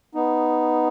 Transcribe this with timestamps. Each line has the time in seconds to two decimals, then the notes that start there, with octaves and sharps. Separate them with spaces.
0.15 B3 D#4